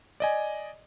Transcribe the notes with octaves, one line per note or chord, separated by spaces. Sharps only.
D5 D#5 G#5